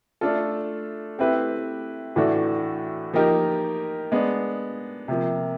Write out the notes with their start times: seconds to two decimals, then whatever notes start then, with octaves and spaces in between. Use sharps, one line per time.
0.21 A3 D4 F4 A4
1.18 A3 C4 E4 G4 B4
2.16 A2 E3 A3 D4 F#4
3.14 F3 A#3 D#4 G4 A#4
4.12 G#3 B3 D4
5.08 C3 F3 A#3